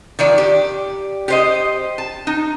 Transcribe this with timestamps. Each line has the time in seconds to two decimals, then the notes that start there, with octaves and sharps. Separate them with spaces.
0.19 D#3 F3 D5
0.38 G4
1.28 G4 C5 D#5
1.98 A5
2.27 D#4